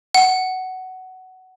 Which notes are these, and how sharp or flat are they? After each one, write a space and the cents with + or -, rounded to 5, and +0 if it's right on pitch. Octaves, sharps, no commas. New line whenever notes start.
F#5 +15